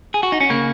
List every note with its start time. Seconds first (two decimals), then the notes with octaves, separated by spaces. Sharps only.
0.14 G#4
0.23 F#4
0.32 D#4
0.40 C#4
0.50 C#3 A#3